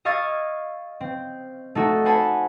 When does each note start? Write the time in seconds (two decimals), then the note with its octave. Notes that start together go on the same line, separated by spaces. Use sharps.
0.05 D#5 F5 C#6 E6 G#6 A6
1.01 C4
1.75 A3 D#4 F#4 A4
2.05 C5 F#5 G#5 A5 B5